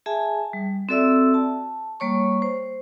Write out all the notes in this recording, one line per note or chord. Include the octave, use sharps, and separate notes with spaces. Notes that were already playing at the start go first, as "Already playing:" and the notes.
G#4 E5 G#5 A5
G3
C4 F#4 A4 D5 E5 E6
A5
G3 A#3 C#5 C#6
C5